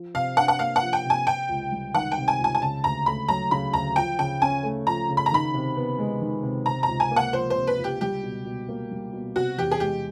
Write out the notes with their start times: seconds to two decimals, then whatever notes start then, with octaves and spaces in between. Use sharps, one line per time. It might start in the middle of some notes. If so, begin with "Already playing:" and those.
Already playing: F3
0.14 C3 F5
0.37 D4 F#5
0.48 F#5
0.59 A#3 F5
0.76 F#5
0.82 F3
0.93 G5
1.04 C3
1.10 G#5
1.27 C3 G5
1.49 C#2
1.72 G3
1.94 D#3 F#5
2.12 G5
2.17 C3
2.28 G#5
2.39 C#2 G#5
2.55 G#5
2.62 C#3 A5
2.84 D2 A#5
3.06 A3 B5
3.28 F#3 A#5
3.51 C#3 B5
3.74 D2 A#5
3.96 F3 G5
4.19 C#3 G5
4.42 C#4 G#5
4.63 A3
4.86 F3 A#5
5.09 C#3
5.17 B5
5.26 A#5
5.32 D#3 B5
5.54 C3
5.76 B3
5.99 G#3
6.21 D#3
6.43 C3
6.66 C3 A#5
6.83 C#2 A#5
7.00 G#5
7.11 A#3
7.16 F#5
7.33 F3 C5
7.50 C5
7.56 C3
7.67 B4
7.78 C#2
7.84 G4
8.01 G3 G4
8.23 B2
8.45 B2
8.69 A#3
8.91 G3
9.13 B2
9.36 C3 F#4
9.58 E2 G4
9.71 G#4
9.80 G#3 G4